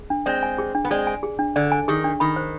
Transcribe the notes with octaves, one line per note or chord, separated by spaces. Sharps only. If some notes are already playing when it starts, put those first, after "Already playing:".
Already playing: G#4
D4
G#3 C4 D5
G#5
G#4
D4
B3
G#3 C4 D5
G#5
G#4
D4
D3 D5
G#5
D#3 G#4
D4
D#3 B5
C5